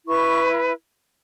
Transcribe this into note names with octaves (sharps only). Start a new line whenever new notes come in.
E4 B4 C#6